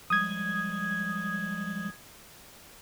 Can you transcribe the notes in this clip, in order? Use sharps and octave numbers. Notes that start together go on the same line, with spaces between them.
F3 G3 G#3 D#6 G#6